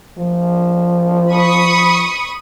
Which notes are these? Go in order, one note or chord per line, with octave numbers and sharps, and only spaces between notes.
F3
B5 C#6 D#6